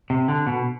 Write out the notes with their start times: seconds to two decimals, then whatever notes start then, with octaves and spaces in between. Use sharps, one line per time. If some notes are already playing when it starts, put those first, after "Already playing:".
0.10 C3
0.28 D3
0.47 B2